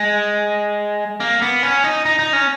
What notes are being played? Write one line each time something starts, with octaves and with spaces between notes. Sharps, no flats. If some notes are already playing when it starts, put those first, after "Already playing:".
Already playing: G#3
A#3
B3
C#4
D#4
D#4
D#4
C#4